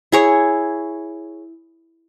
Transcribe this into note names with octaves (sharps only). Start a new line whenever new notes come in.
E4 G#4 C#5